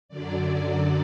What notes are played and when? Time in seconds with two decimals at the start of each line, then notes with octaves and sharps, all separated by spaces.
0.09 F#2 D3 F#3 D5